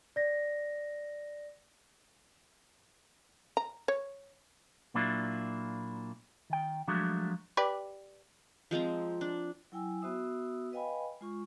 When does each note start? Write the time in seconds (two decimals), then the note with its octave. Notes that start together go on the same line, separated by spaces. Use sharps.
0.16 D5 A#6
3.57 A#5
3.88 C#5
4.94 A#2 F#3 A#3 D4 E4 F4
6.50 D#3 G5
6.88 F3 F#3 G#3 A3 D4 F#4
7.57 G4 B4 D5
8.71 F3 G#3 C4 A#5
9.21 D4
9.72 F#3 E4 G5 G#5 E6
10.02 B3 F#4 C5 E5 D#6 E6
10.72 B4 D#5 F5 G5 G#5 B5
11.21 G#3 F4 C#6